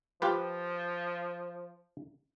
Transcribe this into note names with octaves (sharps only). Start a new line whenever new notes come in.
F3 F4 G4 B4